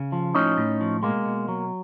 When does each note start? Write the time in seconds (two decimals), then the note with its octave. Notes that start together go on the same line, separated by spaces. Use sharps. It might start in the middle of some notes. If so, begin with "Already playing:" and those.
Already playing: C#3
0.12 F3
0.35 A2 C#4 D#4
0.57 A2
0.81 F3
1.03 B2 G#3 A#3
1.26 B2
1.48 F#3